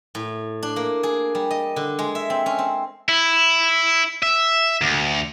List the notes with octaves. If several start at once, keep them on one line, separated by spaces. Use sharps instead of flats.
A2
D4
A#3
G#4
G3
D#5
D3
G#3
E5
C4
C#4
C4
E4
E5
D2